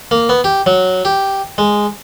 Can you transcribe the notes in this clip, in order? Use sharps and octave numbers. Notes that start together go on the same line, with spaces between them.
A#3
B3
G4
F#3
G4
G#3